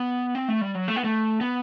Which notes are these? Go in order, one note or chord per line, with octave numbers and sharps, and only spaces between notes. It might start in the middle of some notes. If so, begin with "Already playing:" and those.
Already playing: B3
C4
A3
G3
F#3
A3
B3
A3
B3